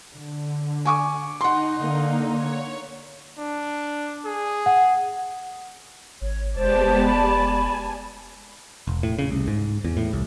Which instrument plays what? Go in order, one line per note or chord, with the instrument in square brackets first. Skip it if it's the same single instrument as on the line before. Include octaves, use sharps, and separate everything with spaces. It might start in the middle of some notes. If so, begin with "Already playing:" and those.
[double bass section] D3
[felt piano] G#5 C#6 D6
[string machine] D#4 [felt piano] F#5 C6
[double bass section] D3 A#3
[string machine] C#5
[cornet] D4
G#4
[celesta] F#5
[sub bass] G#1 [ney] C#5
[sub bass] F1 [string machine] G#3 B3 G4 [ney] C5 [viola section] D5 A5
[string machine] G#5 [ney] B5
[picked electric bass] E1
A2
C#3
C2
G#2
E2
A2
C2